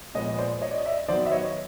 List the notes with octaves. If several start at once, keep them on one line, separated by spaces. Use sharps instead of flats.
A#2 F3 G#3 B3 C#5 D#5
C5 D5
C#5 D#5
D5
D#5
D5 E5
D#3 F#3 B3 C5 D5
E5
C#5 D#5